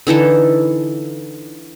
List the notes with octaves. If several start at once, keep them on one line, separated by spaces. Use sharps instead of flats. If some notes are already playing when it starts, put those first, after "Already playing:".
D3 E3 D#4 A4